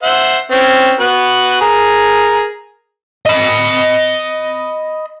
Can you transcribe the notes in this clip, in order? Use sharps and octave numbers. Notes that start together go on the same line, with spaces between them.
C5 E5 F#5
C4 C#4
B3 F#4 B4
G#4 A#4
D#5 B5